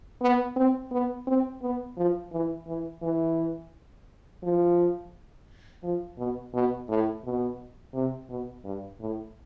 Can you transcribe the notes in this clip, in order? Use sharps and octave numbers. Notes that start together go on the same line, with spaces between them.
B3
C4
B3
C4
B3
F3
E3
E3
E3
F3
F3
B2
B2
A2
B2
C3
B2
G2
A2